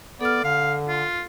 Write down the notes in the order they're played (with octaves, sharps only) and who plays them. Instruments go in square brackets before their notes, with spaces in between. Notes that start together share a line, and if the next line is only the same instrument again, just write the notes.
[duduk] B3 [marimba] A4 F6 [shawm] D5
[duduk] D3 [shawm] F5
[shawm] F4